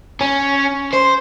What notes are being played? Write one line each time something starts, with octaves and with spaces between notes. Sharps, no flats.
C#4
C5